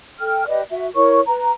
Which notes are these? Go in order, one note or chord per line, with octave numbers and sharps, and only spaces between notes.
A4 G5 F6
G4 B4 D5 D#5
F#4 E5
E4 A#4 C#5 C#6
B4 A#5